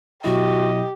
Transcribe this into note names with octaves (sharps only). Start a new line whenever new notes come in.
B2 F#3 E4 F#4 G4 D#5